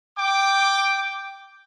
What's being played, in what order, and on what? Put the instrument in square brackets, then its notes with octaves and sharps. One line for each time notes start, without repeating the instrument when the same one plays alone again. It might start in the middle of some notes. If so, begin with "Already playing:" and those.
[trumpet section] G5 D6